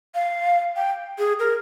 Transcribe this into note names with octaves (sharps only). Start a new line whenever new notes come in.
F5
G5
G#4
A#4